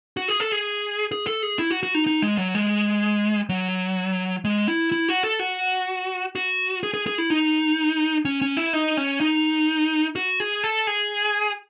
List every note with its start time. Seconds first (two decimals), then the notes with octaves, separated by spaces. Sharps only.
0.17 F#4
0.28 G#4
0.40 A4
0.52 G#4
1.12 G#4
1.27 A4
1.43 G#4
1.59 E4
1.71 F#4
1.83 F#4
1.95 D#4
2.07 D#4
2.22 G#3
2.38 F#3
2.55 G#3
3.49 F#3
4.45 G#3
4.68 E4
4.92 E4
5.09 F#4
5.23 A4
5.40 F#4
6.35 F#4
6.83 G#4
6.94 G#4
7.07 G#4
7.18 E4
7.30 D#4
8.25 C#4
8.42 C#4
8.57 E4
8.73 D#4
8.97 C#4
9.20 D#4
10.16 F#4
10.40 G#4
10.64 A4
10.87 G#4